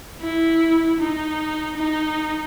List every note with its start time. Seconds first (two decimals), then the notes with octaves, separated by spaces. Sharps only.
0.21 E4
0.99 D#4
1.77 D#4